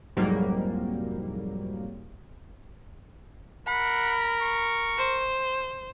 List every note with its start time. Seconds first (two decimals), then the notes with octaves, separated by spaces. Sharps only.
0.17 C2 F2 G#2 F#3 G3 A#3
3.67 A#4 F#5 B5
4.41 C#6
4.98 C5